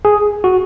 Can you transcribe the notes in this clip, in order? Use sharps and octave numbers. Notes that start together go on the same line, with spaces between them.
G#4
F#4